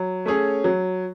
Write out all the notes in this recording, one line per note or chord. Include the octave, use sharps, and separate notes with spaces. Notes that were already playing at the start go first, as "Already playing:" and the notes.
Already playing: F#3
A3 C#4 G#4 C#5
F#3